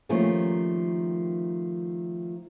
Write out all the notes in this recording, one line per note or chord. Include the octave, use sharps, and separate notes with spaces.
D#3 F3 G3 A3 A#3 C#4